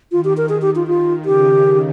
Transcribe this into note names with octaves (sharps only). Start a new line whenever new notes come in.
D#3 F4
G4
A#4
D#3 G#4
G4
F4
F4
C#3 G4